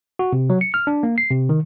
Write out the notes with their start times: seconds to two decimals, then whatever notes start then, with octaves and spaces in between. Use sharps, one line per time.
0.19 F#4
0.33 C3
0.50 F#3
0.61 C#7
0.74 F6
0.87 D4
1.03 A#3
1.18 C7
1.30 C3
1.49 D#3